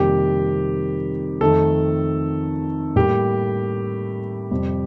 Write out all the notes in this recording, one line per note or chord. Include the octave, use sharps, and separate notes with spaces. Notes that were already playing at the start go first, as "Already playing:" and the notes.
Already playing: F2 C3 D#3 G3 A#3 G4
F2 D#3 A3 A4
A2 G3 A#3 G4
F2 C3 G3